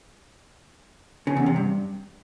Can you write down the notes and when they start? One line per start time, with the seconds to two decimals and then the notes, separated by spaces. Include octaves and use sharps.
1.27 C#3
1.37 E2
1.46 C3
1.56 G2